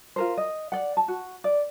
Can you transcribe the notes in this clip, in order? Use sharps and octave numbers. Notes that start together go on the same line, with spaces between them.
F4 A#4 C5
D#5
D5 F#5
A5
F#4
D5